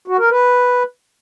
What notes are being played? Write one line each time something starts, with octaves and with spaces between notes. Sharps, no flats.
F#4
A#4
B4